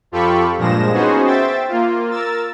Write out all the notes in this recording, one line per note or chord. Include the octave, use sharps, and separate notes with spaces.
F2 F4 G4 A4 B5 C#6
G2 A#2 F3 G#3 A#6 E7
B3 C#4 D#4 F#4 G#4 C5
C5 E5 G5 A6
A#3 F4
A#4 E6 A6